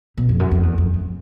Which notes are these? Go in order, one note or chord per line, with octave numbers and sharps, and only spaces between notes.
B2
F2
F#2
F2
E2
F2
F#2